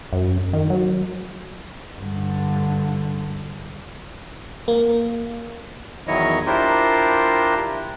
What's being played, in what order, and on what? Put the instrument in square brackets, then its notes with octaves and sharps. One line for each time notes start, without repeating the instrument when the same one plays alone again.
[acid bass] F#2
D#3
F#3
[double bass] G2 D3
[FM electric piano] A#3
[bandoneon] E2 D#3 F#3 E4 C#5 D#5
D4 E4 F4 G4 A#4 C5